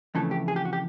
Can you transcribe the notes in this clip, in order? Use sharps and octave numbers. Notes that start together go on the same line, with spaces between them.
F2 C#3 E3 A3 A4
G4
G#4
G4
F#4
G4